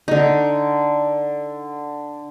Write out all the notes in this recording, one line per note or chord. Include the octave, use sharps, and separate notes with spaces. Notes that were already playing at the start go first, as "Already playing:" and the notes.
D3 D#4